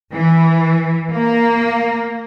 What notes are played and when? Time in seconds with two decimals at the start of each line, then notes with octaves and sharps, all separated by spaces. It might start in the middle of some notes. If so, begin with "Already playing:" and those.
0.13 E3
1.12 A#3